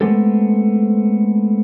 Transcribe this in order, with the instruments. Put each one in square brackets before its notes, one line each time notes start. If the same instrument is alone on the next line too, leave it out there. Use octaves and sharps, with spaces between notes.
[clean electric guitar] G#3 A3 B3 C4 G4 A4